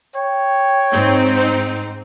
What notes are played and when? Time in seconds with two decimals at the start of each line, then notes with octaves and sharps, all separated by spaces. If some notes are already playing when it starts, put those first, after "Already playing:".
0.16 C#5 G5
0.93 G#2 C4 D#4